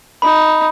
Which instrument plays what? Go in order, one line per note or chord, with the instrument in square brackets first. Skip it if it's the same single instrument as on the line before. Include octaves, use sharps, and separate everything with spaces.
[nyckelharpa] D#4 [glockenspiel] B5